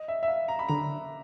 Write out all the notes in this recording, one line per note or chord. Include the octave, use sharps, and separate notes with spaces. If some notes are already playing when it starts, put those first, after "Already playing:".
Already playing: D#5
E5
E5
F5
A#5
B5
D3 A#5